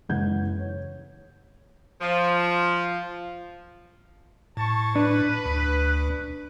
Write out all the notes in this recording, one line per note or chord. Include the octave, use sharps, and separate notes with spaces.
F#1 E3 G#3 F#5 G6 G#6
C#5
F3
A2 A5 C#6
D4 B4
D2